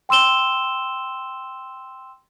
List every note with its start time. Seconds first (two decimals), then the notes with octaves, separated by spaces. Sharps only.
0.09 G5 C6 E6 E7 G7